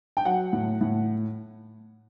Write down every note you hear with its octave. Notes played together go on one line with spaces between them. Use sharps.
G5
F#3 F#5
A2
A2